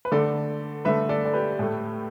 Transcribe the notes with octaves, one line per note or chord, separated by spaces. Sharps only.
B4
D3 A3 A4 D5
D3 A3 B4 E5
A4 D5
D5
G4 B4
A2 A3